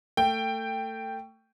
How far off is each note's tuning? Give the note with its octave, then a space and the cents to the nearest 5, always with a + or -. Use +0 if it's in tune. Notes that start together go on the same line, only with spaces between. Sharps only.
A3 +25 G5 +0